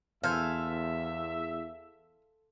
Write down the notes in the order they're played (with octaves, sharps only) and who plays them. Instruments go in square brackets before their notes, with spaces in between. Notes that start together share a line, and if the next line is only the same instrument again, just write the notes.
[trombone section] E2 [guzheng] A4 C5 G#5 [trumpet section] E5 [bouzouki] F5